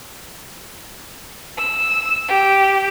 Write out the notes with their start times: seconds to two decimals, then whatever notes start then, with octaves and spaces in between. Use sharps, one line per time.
1.58 E6
2.28 G4